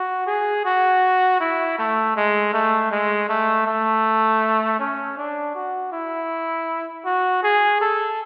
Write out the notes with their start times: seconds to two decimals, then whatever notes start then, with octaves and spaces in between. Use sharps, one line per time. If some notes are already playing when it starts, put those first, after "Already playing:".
Already playing: F#4
0.27 G#4
0.65 F#4
1.41 E4
1.78 A3
2.16 G#3
2.53 A3
2.91 G#3
3.29 A3
3.66 A3
4.79 C#4
5.18 D4
5.55 F#4
5.92 E4
7.05 F#4
7.43 G#4
7.81 A4